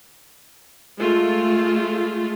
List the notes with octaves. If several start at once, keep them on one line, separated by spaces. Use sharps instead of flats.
G#3 A3 F4